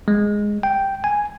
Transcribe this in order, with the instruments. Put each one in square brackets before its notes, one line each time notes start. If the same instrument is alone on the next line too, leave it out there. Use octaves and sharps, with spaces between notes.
[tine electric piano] G#3
G5
G#5